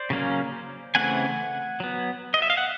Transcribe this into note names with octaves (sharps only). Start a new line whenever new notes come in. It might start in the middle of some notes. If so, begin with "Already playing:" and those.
Already playing: C5 D5
C#3 F#3 A#3 C#4
C#3 E3 A3 C4 F#5 G#5
F#3 B3
D#5
E5
F5
F#5